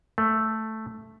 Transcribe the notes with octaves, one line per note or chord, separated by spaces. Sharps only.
A3